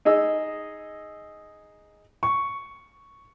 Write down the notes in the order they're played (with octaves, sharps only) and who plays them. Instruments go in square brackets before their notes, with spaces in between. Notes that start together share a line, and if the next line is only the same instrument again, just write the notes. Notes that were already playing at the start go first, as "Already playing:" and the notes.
[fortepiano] D#4 G#4 D#5 E6
[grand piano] C#6